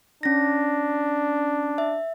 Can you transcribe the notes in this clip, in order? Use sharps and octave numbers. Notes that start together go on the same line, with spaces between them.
C#4 D4 A#6
E5